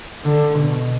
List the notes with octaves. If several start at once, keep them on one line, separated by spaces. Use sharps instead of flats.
D3
B2